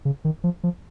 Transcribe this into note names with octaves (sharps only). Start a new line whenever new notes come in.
C#3
D#3
F3
F3